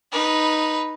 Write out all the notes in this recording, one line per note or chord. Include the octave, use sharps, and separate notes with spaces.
D#4 B4